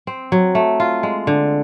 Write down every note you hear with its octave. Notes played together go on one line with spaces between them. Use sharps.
C4
F#3
A3
F4
G#3
D3